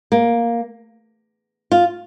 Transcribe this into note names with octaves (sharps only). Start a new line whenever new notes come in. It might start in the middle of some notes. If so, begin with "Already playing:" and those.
A#3
F4